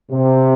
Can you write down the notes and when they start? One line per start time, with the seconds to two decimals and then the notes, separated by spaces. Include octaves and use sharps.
0.12 C3